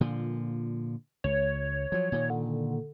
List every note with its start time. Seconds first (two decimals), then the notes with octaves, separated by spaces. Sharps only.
0.01 A#2 D3 F3
1.24 C#2 C#5
1.92 F3 F#3
2.12 A#2 D#3
2.30 D3